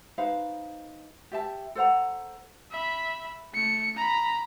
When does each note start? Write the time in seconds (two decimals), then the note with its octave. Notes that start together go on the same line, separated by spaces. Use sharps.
0.18 D#4 B4 C5 F5
1.32 G4 E5 A5
1.75 A4 C5 F#5 A#5
2.71 E5 B5
3.54 A3 C#7
3.96 A#5 B5